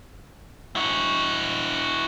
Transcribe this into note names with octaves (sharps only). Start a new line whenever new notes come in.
E4 F#4